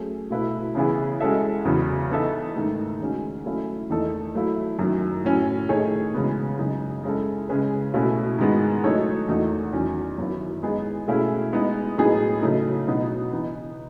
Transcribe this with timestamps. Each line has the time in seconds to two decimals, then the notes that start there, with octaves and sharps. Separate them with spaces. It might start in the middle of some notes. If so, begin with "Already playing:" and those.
Already playing: F#3 A3 C#4 G#4
0.30 B2 A3 E4 B4
0.75 C#3 E3 B3 E4 G#4
1.20 G#3 C#4 F#4 A4 E5
1.65 E2 C#3 F#3 B3
2.10 E3 B3 D#4 A4 E5
2.55 G#2 D#3 A3
3.00 D#3 G#3 C#4 F#4
3.45 F#3 A3 C#4 E4
3.90 E2 D#3 A3 D#4 A4
4.35 F#3 A3 E4
4.79 F#2 D#3 F#3
5.25 A2 F#3 C#4
5.69 D#3 A3 D#4 G#4 C#5
6.14 C#3 E3 G#3 B3 F#4
6.59 F#2 C#3 G#3 D#4
7.04 G#3 C#4 E4 A4
7.49 C#3 G#3 C#4 G#4 B4
7.94 B2 A3 C#4 E4
8.38 G#2 D#3 G#3 B3 F#4
8.84 F#3 A3 D#4 A4 C#5
9.28 E2 D#3 A3 D#4 F#4
9.73 E2 D#3 F#3 C#4
10.18 F#2 D#3 F#3 B3 E4
10.62 G#3 B3 D#4 G#4
11.07 B2 A3 C#4 E4 G#4
11.53 G#3 B3 D#4
11.97 A2 F#3 B3 D#4 G#4
12.42 C#3 F#3 A3 D#4
12.87 B2 F#3 B3 D#4 F#4
13.32 E3 B3 D#4